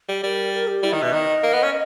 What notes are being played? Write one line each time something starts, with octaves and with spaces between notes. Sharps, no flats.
G3
G3 A#4
A#4
G4
G3 E4
D#3
D#5
B2 E5
D#3 D#5
A#3
B3
C#4